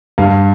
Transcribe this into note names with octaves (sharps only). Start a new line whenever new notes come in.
G2 F5